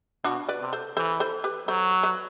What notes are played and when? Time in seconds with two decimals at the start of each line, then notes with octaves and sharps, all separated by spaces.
0.24 B2 D4 F#4
0.48 B4 D5
0.61 C3
0.73 A4 C5
0.97 E3 A4 C5
1.20 A4 C5
1.44 G4 B4
1.68 F#3 A4 C5
2.03 B4 D5